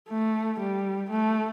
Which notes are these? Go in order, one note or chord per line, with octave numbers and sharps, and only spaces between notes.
A3
G3
A3